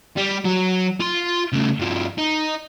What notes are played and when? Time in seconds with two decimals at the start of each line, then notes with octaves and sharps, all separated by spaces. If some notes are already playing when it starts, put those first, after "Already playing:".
0.17 G3
0.45 F#3
1.00 F4 C6
1.52 C#3 A3
1.79 G2 F3
2.18 D#4